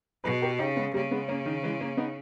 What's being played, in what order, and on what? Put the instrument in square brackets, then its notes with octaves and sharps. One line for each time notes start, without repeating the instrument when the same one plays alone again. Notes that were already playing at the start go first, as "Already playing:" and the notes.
[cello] B2 [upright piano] G#4 B4
[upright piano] G4 A#4
[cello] C#3 [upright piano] D#4 G4
[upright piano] G#3 B3
[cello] C#3 [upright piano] G3 A#3
[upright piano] G#3 B3
A#3 C#4
D#3
E3 G#3
A#3 C#4
B3 D#4